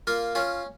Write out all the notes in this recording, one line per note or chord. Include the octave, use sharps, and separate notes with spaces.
A#3 F4
C#4 F4